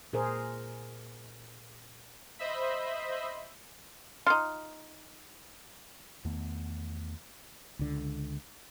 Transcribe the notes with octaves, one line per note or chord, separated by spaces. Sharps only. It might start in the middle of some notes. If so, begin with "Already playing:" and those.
A#2 G#4 A#4 C5
C5 D#5 E5 B5
D#4 F4
E2 D#3 A3 B3
C#2 D3